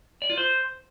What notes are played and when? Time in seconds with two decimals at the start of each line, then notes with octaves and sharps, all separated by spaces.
0.22 D5
0.30 F4
0.37 C5